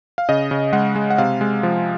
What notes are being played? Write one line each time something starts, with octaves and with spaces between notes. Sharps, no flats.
F5
C#3 D#5
C#3
G#3 F#5
G#3
F#5
C3 F5
G#3
F3